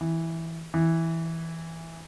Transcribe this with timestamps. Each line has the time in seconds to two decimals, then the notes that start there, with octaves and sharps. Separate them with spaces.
0.01 E3
0.74 E3